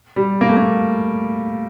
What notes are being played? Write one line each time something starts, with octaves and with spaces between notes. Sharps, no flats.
G3
A#3
A3
A#3